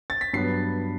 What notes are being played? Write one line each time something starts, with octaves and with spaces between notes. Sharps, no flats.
A6
B6
G2 F#3 B3 C7